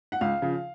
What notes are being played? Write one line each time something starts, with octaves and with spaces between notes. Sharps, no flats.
F#5
C#2 F5
C#3 F3